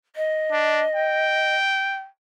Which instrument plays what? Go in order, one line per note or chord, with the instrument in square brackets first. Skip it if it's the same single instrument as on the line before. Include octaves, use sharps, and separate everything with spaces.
[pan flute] D#5
[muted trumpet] D4
G5